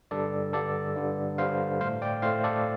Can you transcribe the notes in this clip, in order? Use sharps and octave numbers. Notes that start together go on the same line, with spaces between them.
G2 D3 G3 A4 D5
G2 D3 G3 A4 D5
G2 D3 G3
G2 D3 G3 C5 F5
A2 A3 C5 F5
D5 G5
A2 A3 C5 F5
A4 D5